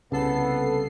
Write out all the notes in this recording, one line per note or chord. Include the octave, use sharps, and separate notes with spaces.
C2 C#3 B3 A4 C7